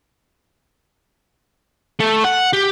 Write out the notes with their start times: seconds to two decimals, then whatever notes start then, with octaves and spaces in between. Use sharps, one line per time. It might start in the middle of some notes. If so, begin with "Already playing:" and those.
2.00 A3
2.24 F#5
2.53 G4